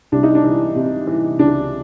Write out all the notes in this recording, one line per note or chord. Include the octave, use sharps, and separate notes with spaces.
C2 D4
D#4
D4
E3
C3
E3
C#2 D4